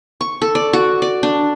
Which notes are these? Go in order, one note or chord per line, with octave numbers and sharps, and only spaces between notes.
C#6
A4
D5
F#4
D5
D4